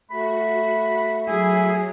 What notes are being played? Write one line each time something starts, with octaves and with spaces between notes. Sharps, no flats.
A3 F#4 B5
F#3 E4 G#4